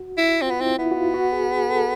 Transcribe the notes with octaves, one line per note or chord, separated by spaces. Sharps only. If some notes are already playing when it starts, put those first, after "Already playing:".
Already playing: F#4
E4
C4 F4
B3
C4 E4
B3 E4
F#4
F4
F#4
G#4
G#4
A4